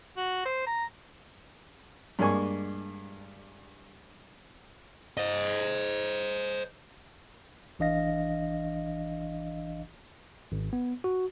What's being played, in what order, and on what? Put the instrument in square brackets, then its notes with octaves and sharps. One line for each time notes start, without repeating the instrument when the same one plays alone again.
[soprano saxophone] F#4
C5
A#5
[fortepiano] G2 G#3 A#3 D4 G#5 C#6
[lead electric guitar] C5 D#5
[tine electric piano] A1 E3 D4 D#5 F5 A#6
G#1
B3
F#4